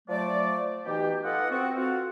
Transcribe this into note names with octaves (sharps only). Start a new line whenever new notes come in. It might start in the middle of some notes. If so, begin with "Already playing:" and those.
F3 F#3 A3 D5
B2 E3 D#4 G4
F4 A4 B4 D#5 F#5
C4 F#4
F4 F#4 A4 F5 F#5